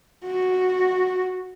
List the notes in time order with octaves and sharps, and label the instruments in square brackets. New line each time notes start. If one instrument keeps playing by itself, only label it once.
[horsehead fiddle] F#4